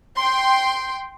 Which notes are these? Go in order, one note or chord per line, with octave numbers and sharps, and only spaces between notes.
G5 C6